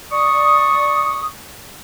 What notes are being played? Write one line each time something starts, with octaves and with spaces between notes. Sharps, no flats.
D5 C#6 D#6